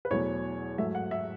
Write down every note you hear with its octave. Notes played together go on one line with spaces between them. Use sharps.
B4
E2 B2 F#3 A3 C#5
G#2 F#3 A3 E5
F#5
E5